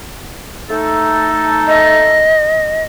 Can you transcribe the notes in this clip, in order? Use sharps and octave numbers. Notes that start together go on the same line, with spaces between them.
A3 D#4 A4
D#5